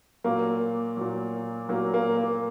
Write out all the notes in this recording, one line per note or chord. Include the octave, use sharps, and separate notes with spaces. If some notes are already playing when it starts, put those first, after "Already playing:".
A#2 F#3 A#3
A#2 F#3
A#2 F#3 A#3
A#3
A#3